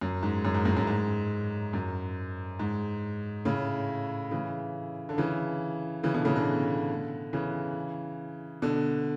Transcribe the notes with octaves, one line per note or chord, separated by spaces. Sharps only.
F#2
G#2
F#2
G#2
F#2 A2
F#2
G#2
F#2
G#2
A2 C#3
C#3 E3
D3
C#3 E3
C#3 E3
B2 D3
A2 C#3
B2 D3
C#3 E3
B2 D3